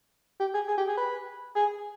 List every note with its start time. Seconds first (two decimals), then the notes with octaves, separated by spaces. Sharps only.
0.40 G4
0.54 G#4
0.68 G#4
0.78 G4
0.88 G#4
0.97 B4
1.56 G#4